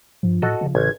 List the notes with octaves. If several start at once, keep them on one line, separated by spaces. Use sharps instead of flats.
G2 F3
A2 F#4 A4 D#5
C#3 F3
A1 G#6